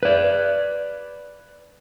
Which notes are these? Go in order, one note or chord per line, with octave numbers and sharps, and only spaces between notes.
B4 D5